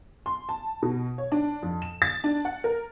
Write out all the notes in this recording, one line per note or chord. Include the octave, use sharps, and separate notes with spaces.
C6
A5
B2
C#5
D4
F2
E7
A6
D4
F#5
A#4